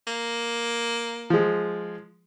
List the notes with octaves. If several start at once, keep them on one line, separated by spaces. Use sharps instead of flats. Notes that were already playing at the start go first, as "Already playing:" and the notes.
A#3
F3 G#3